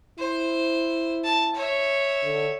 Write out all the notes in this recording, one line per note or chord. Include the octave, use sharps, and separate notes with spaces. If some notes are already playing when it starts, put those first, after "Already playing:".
E4 C5
A5
C#5 E5
D3